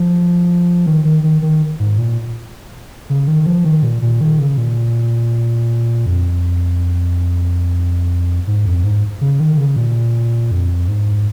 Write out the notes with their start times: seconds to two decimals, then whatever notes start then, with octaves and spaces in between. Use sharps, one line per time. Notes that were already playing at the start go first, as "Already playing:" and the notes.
Already playing: F3
0.86 D#3
1.05 D#3
1.24 D#3
1.42 D#3
1.80 G#2
1.98 A#2
3.10 C#3
3.28 D#3
3.46 F3
3.64 D#3
3.83 A#2
4.02 A#2
4.21 D#3
4.39 C#3
4.58 A#2
6.06 F2
8.47 G#2
8.65 F2
8.84 G#2
9.21 C#3
9.40 D#3
9.58 C#3
9.76 A#2
10.51 F2
10.88 G#2